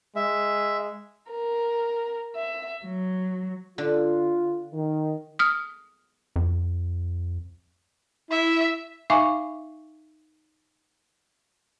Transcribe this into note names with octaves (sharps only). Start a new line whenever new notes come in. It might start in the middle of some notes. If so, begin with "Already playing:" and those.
G#3 E5
A#4
E5
F#3
D3 F4
D#3
D#6 F6
F2
E4 E5
D#4 E5 F5 G#5 C#6 D6